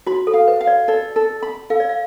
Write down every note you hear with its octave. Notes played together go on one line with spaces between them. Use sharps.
F#4 B5
A4
F5
B4
F5
D5
A4 D5
A4
B5
A4 F5
D5
F5